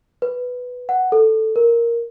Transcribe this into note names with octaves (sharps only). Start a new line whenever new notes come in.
B4
F#5
A4
A#4